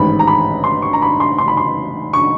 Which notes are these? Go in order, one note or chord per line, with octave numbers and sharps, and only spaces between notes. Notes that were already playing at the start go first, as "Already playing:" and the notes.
Already playing: A1 G#2 D#3 B5
A#5
B5
C6
C#6
A#5
B5
C6
C6
B5
C6
C#6